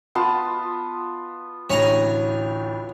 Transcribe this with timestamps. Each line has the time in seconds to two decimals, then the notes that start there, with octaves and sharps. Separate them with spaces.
0.15 B3 F4 A5 C6
1.70 A1 D2 A2 C#5 G#5 A#5